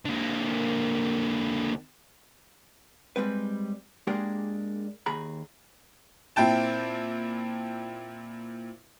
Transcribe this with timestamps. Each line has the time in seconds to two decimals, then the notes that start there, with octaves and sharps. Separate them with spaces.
0.06 D3 A#3
3.16 G3 G#3 C4 B4
4.07 G#3 A#3 D4 G4 G#4 A#4
5.06 D#2 G#4 A#5 B5
6.36 A#2 C4 E4 G5 A5